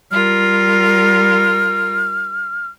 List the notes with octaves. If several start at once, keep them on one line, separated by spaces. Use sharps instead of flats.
G3 F4 A#4 F6